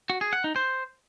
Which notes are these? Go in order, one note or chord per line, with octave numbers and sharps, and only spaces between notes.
F#4
G#4
F#5
D#4
C5